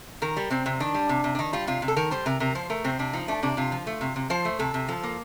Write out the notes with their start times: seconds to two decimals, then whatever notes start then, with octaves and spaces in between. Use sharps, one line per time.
0.22 D#3 A#4
0.37 G3
0.51 C3 C4
0.66 C3
0.80 D#3 D4
0.95 G3
1.09 C3
1.24 C3
1.35 D4
1.39 D#3 D#4
1.53 G3 F4
1.67 C3 F4
1.82 C3
1.88 A4
1.96 D#3 A#4
2.11 G3 C5
2.26 C3 A#4
2.40 C3 A#4
2.55 F3 C5
2.70 A3 A#4
2.84 C3 C4
2.99 C3 D4
3.13 F3 D#4
3.28 A3 D4
3.43 C3 D4
3.57 C3 F4
3.72 F3
3.87 A3
4.01 C3
4.16 C3
4.30 F3 C5
4.45 A3
4.59 C3 A4
4.74 C3
4.88 F3 A4
5.03 A#3